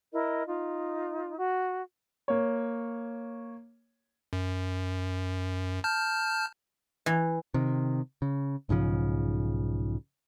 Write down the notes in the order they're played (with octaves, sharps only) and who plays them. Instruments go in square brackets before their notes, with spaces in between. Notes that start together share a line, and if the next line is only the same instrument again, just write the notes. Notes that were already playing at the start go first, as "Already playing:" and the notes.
[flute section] E4 A#4 D#5
D#4 F4
F#4
[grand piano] A#3 C#5
[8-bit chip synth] F#2
A5 F6 G6
[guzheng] E3
[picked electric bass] C3 D#3
C#3
B1 G#2 C#3 F3